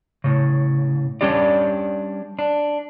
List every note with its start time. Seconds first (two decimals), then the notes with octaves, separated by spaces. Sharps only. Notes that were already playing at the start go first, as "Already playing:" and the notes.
0.24 A2 C#3
1.21 G3 C#4 D4 G4 D5
2.39 D4